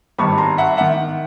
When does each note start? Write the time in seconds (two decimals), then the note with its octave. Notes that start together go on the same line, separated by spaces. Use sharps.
0.18 G#1 G2 D#3 B5 C#6
0.38 A#5 C6
0.58 E5 F#5
0.77 D#3 E5 F#5